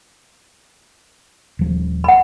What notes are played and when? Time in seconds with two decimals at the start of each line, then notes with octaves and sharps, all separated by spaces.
1.59 D#1 F3
2.04 F#5 B5